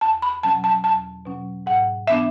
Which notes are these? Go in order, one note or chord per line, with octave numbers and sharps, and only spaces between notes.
E2 A5
B5
B2 F#3 C#4 A5
A5
E2 A5
B2 F#3 C#4
G#2 F#5
E3 B3 D4 E5